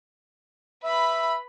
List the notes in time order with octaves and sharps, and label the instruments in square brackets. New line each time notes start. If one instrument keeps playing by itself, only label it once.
[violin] B4 B5 [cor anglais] E5